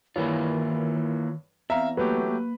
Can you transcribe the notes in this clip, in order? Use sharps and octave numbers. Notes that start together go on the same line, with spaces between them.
G2 D#3 E3 A#3 E4 F4 C#5
E2 C4 E5 F5 A#5
F#3 A3 A#3 G4 B4
A#3